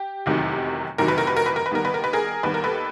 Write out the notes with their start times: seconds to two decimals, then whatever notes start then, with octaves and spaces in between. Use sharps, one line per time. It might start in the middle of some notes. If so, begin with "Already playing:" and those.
Already playing: G4
0.26 F1 E2 C3 D#3 F#3
0.98 F1 E2 C3 D#3 F#3 A#4
1.08 B4
1.18 A#4
1.27 B4
1.37 A#4
1.46 B4
1.56 A#4
1.66 B4
1.71 D#2 D#3 G3 B3 A#4
1.85 B4
1.94 A#4
2.04 B4
2.13 G#4 A#4
2.43 D#2 D#3 G3 B3 B4
2.54 A#4
2.64 A4 B4